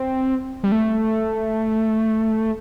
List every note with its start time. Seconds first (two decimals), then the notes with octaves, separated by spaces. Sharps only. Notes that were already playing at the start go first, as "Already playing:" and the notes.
Already playing: C4
0.64 G3
0.72 A3